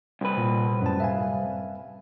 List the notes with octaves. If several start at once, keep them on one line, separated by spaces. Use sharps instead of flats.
C2 B4
A#2
F#2 A2 A5
E5 F5 G#5